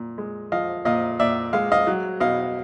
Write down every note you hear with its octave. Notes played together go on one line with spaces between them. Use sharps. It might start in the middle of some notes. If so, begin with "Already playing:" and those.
Already playing: A#2
G#3
F3 D#5 F5
A#2 D#5 F5
A#2 D5 E5
G#3 F5
D#5 F5
F#3
B2 D#5 F5